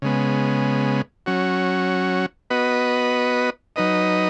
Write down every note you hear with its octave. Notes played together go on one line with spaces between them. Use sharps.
C#3 G#3 B3
F#3 C#4 F#4
B3 F#4 B4 D#5
F#3 D#4 B4 D#5